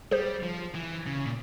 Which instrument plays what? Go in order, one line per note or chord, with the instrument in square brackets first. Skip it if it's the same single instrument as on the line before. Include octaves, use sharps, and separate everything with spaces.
[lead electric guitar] G3 [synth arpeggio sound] G#4 C5
[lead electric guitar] F3
E3
C#3
A#2